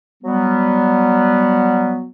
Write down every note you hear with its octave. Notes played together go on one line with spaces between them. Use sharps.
F#3 G3 B3